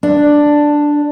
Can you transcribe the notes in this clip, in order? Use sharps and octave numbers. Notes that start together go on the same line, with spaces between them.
D4